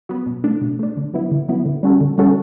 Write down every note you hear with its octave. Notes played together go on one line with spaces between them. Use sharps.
F#3 B3
B2
A3 D4
B2
A3 D4
D3
F#3 B3 E4
D3
F#3 B3 E4
D3
G3 C#4 F#4 A4
D3
G3 C#4 F#4 A4